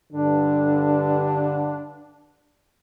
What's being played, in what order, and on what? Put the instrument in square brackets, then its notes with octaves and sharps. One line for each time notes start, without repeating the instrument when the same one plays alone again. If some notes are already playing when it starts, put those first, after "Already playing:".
[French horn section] G2 D3 [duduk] D4